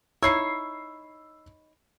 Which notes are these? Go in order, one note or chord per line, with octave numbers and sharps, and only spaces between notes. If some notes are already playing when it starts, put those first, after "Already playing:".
D#4 E4 C#5 E6 C7